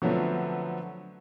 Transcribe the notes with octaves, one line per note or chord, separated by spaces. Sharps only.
D3 F3 F#3 A3 B3 C4